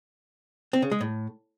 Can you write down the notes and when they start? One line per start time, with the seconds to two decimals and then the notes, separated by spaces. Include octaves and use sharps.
0.73 C4
0.82 C#3
0.91 G#3
1.01 A2